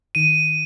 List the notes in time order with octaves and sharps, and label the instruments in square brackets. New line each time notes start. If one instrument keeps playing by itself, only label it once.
[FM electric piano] D#3 [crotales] D#7